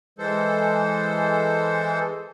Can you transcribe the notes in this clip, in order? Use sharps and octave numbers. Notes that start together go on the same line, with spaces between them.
E3 G#3 A4 C5